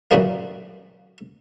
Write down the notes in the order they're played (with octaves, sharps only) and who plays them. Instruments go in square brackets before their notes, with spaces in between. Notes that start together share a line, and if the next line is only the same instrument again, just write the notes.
[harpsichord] F#2 A#2 C#3 E3 G3 A#3